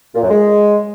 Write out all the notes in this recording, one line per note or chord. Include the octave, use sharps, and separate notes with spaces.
A#2
F#2
G#3